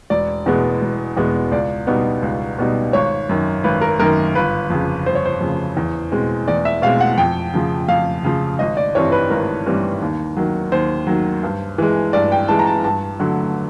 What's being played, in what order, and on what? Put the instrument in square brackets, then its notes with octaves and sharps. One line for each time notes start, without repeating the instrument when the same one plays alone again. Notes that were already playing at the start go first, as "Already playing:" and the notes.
[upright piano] E1 D5
E2 B2 G#3 B3
E1
E2 B2 G#3 B3
C#2 D5
B2 G3 B3 D#4
C#2
B2 G3 B3 D#4
G#1 C#5
F#2 D#3
G#1 B4
A#4
F#2 D#3 A#4
G1 B4
F2 C#3
G1 C5
C#5
C5
F2 C#3
E2
B2 G#3 C4
E2 D5
E5
B2 G#3 C4 F5
F#5
F2 G5
C#3 F3
F2 F5
C#3 F3
G#1 D#5
D5
G2 E3 G3 C4 C#5
B4
G#1 A#4
G2 E3 G3 C4
D#2
D#3 F#3
D#2 C5
D#3 F#3
G2
E3 G#3
G2 D5
G5
E3 G#3 A5
A#5
A5
G2 A5
D3 F#3 A3